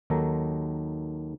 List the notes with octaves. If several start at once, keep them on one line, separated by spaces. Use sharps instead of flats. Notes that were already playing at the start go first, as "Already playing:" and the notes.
D#2 D#3 F#3 A4 A#5